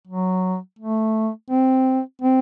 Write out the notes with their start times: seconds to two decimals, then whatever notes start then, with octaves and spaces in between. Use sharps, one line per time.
0.07 F#3
0.79 A3
1.50 C4
2.22 C4